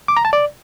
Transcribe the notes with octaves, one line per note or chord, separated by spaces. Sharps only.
D6
A#5
A5
D5